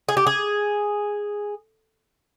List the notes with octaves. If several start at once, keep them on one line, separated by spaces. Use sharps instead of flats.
G#4
G4
G#4